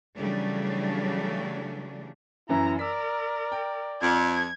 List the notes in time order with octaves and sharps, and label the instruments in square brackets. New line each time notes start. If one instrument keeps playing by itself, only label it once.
[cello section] C#3 E3 F#3 G3 A3 D4
[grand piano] F#2 E3 C#4 [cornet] E4 [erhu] A#5
[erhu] A#4 [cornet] D5 [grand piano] E6 B6
[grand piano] G5
[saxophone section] F2 [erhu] G#6